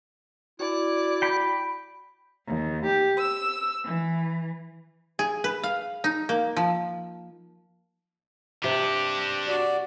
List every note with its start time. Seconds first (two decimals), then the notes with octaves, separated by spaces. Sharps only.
0.60 E4 F#4 D5
1.22 G5 B5
2.47 D#2
2.86 G4
3.18 E6
3.84 E3
5.19 G#4
5.44 B4
5.63 F5
6.04 D#4
6.29 A#3
6.57 F3
8.64 C3 D4 G4
9.48 F#4 D5